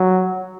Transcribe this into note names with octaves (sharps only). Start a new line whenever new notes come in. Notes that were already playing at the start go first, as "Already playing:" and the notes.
Already playing: F#3